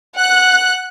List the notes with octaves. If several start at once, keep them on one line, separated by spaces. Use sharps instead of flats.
F#5 F#6